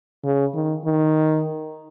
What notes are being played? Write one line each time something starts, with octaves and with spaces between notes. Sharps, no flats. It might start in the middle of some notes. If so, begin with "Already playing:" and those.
C#3
D#3
D#3